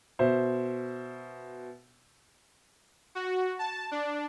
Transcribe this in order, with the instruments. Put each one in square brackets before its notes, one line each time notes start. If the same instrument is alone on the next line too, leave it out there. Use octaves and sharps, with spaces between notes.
[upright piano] B2 C5 E5
[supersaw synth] F#4
A5
D4